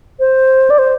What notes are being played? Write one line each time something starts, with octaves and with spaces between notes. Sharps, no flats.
C5
D5
C5